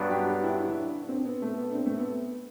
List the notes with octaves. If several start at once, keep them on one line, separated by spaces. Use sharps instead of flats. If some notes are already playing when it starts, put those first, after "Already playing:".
Already playing: G2 F#3 B3 D4
G4
G4
E4
D4
D4
C4
B3
A3
B3
D4
C4
A3
B3